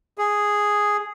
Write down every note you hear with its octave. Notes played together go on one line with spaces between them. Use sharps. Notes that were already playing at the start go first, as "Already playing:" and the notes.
G#4